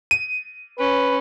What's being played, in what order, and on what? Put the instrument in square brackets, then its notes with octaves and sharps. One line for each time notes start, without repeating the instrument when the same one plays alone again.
[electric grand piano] D#7
[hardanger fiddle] C#4 [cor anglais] B4